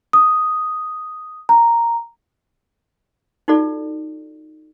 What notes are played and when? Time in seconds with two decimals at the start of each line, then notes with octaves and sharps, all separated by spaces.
0.13 D#6
1.49 A#5
3.48 D#4 F4 F#4 A4 D5